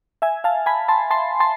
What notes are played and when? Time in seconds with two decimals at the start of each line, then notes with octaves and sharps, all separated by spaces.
0.22 E5 G#5
0.44 F5 A5
0.66 G#5 B5
0.88 A5 C6
1.11 A5 C6
1.40 A5 C6